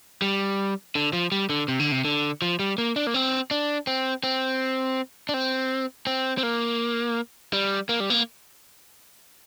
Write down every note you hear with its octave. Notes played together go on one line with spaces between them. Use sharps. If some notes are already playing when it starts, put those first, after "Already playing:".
G3
D3
F3
G3
D3
C3
D3
C3
D3
F3
G3
A#3
D4
A#3
C4
D4
C4
C4
D4
C4
C4
C4
A#3
G3
A#3
G3
A#3